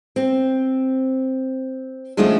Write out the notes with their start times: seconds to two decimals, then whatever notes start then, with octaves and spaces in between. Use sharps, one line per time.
0.16 C4
2.17 D3 F3 G#3 A3 C#4 E4